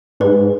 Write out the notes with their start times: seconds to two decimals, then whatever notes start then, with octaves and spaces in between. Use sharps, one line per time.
0.20 G#2 B4